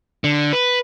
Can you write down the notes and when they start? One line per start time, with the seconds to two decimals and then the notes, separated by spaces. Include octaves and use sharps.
0.24 D3
0.53 B4